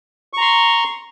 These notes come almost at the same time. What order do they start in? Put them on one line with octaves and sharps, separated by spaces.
C#6 A#5 C6